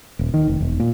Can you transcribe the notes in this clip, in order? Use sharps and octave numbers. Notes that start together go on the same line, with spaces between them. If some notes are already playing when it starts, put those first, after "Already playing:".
D#1
D#3
F1
E1
A#2